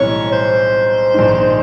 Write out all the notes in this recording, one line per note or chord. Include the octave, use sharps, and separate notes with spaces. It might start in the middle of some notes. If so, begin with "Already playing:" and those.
Already playing: B1 A2 E3 G3 C4 C#5
C5
A#1 G#2 D#3